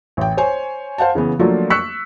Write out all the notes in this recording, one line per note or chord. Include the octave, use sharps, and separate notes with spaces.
A1 G5
C5 C#5 G#5
C5 F5 F#5 A5
C#3 E3 B3
F3 F#3 A3 A#3 D4
C#6 E6 F#6 B6 C#7